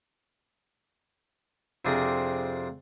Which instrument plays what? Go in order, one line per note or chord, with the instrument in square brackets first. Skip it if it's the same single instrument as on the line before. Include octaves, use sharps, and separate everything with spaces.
[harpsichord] F2 C3 C4 D4 G#4 A#4